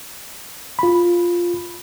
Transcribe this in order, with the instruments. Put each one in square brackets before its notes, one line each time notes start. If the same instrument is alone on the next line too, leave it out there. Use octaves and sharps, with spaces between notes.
[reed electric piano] F4 B5